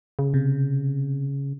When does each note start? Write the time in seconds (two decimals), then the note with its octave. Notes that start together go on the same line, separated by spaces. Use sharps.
0.19 C#3
0.34 C3